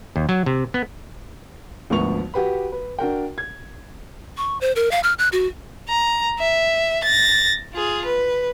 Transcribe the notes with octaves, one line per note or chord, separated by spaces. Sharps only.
D#2
F#3
C3
B3
G#1 D2 F3 B3 C#6 F7
F#4 G4 B4 B5
B4
D4 F#4 A#4 G5
G#6
C#6
C5
A#4
F5
F6
F#6
F#4
A#5
E5
A6 A#6
F4 G#4
B4